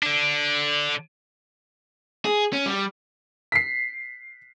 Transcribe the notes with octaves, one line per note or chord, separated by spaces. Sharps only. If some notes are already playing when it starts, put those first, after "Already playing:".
D3 D4
G#4
C#4
G3
B6 C7